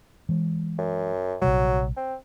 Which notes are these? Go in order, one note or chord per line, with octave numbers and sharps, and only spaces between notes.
E3 G#3
F#2
A#1 C3 F#3 G3
C4